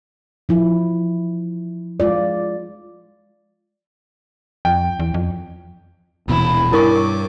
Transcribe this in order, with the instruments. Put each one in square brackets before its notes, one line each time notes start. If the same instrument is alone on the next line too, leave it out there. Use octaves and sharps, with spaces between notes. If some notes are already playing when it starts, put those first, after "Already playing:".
[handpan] F3 E4
G#3 F4 D5
[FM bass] F2 [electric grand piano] G5
[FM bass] E2
F2
[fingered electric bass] D#1 B2 E3 [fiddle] E4
[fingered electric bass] G2 [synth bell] E4 A#4 C#6 [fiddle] C#5 D6